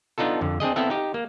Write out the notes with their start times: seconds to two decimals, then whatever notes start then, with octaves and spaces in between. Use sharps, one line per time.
0.18 B3 D4 D#4 F4 A4
0.41 F2 D3
0.60 C4 D4 G#4 D#5
0.76 B3 C4 E4 A4 E5
0.90 D#4 G4
1.14 A#3